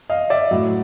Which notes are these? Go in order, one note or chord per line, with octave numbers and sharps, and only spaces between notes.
D#5 F5
D5 E5
A2 F#3